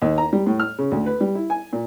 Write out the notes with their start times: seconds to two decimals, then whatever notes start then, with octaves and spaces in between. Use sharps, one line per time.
0.02 D#2
0.18 A#5
0.33 G3
0.47 A2
0.60 F6
0.78 C#3
0.91 D2
1.06 B4
1.21 G3
1.35 E4
1.50 G#5
1.73 A#2